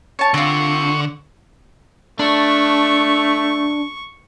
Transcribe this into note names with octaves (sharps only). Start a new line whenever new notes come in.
C#5 A5 C#6
D3 C4 F4
A3 D4 C#6